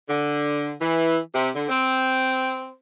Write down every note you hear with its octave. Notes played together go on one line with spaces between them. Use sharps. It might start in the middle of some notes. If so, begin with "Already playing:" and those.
D3
E3
C3
D3
C4